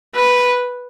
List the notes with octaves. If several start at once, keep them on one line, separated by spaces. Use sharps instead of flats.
B4